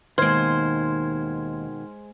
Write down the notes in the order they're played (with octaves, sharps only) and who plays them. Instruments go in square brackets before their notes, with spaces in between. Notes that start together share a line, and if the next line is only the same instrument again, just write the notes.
[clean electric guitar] D#2 [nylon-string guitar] B2 D#3 [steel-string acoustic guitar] G#3 C5 [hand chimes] C6 F6 G#6